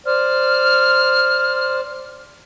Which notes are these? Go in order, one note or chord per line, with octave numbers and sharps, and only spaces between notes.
C5 D5 F6